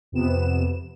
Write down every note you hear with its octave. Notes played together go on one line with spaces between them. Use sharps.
F2 C3 B3 E7